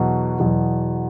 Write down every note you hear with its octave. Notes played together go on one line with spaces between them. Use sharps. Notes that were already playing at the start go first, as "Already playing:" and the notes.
Already playing: E2 B2 F#3
E2 B2 F#3